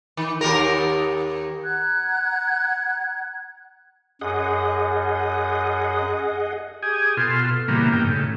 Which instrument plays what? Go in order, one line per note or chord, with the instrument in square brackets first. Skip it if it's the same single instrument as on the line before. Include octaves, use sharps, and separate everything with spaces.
[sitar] D#3
D#2 G4 A#4
[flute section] F#5 A#5 F#6 G#6
[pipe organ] F#2 [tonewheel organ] G#4 D#5 F#5
[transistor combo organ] G4 G#4 G#5 D#6
B2 F4 A4 C6
A#2 C#3 E3 G3 A#3 B3
G2 D#3 A#3 G5
A2 C#3